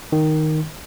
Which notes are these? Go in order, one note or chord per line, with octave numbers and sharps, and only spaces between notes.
D#3